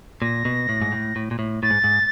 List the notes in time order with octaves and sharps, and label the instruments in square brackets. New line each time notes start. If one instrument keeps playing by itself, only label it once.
[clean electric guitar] A#2 [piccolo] A#6
[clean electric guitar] B2
A2
G#2
A2
A2
A#2
A2
[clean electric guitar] A2 [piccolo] A6
[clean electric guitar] G#2
G#2